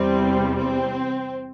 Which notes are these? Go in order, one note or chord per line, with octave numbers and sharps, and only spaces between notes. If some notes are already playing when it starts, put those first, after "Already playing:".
Already playing: E2 C3 G3 C4
C4